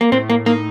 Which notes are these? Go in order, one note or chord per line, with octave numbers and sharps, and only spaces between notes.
A#3
A2 C4
A#3
A#3 D#4